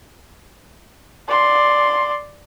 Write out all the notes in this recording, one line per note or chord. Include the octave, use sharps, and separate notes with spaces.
D5 C6